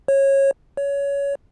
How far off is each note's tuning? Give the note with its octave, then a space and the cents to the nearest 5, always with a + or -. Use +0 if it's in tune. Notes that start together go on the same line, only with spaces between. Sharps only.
C#5 -20
C#5 +20